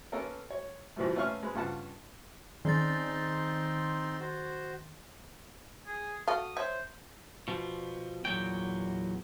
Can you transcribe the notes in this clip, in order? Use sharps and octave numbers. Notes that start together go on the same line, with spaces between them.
A#3 B3 C#4 A4 A#4
C#5
G#2 B2 E3 F3 G3 A3
A3 B3 C#4 F5 C#6 F6
G#3 B4
G2 C#3 F4 F#5 A5
D#3 C4 D#4 C6 A6
F#4 C5
G#4
F#4 A4 F5 D#6
C5 C#5 E5
B2 F3
E2 A#2 F#3 G5